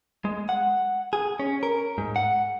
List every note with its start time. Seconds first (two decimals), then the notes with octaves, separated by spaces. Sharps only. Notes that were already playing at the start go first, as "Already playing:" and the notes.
0.25 G#3
0.49 F#5
1.13 G#4
1.40 C#4
1.63 A#4
1.98 G#2
2.16 F#5